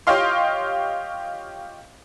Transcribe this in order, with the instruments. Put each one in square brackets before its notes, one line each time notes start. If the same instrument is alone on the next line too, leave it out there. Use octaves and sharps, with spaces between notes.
[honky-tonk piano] F4 G4 C#5 D#5 F5 C6